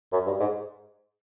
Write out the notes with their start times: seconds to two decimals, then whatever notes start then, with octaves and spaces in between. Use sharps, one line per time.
0.13 F#2
0.26 G2
0.40 G#2